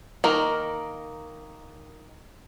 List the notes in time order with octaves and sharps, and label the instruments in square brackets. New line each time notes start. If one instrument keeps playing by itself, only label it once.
[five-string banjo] D#3 A#3 A#4